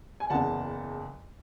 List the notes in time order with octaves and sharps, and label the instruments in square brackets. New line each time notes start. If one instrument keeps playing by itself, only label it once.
[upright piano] G#5
F#1 E2 C#3 F#5 A5